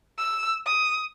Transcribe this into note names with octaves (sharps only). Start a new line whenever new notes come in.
E6
D#6